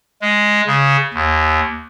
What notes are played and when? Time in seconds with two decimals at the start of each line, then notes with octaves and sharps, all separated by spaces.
0.22 G#3
0.66 C#3
1.14 D#2